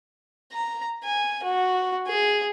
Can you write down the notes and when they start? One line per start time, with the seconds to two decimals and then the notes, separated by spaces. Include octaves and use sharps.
0.52 A#5
1.04 G#5
1.43 F#4
2.07 G#4